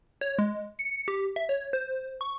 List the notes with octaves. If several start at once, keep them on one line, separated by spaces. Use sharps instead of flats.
C#5
G#3
C#7
G4
E5
C#5
C5
C#6